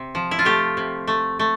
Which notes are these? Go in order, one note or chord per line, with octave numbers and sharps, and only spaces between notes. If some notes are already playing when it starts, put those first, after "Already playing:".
Already playing: C3
F3
E4
F4
A3 G4
C3
A3
A3